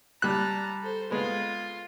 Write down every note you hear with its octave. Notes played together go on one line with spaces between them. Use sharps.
G3 A5 A#5 F#6
A4 C5
G#3 B3 F4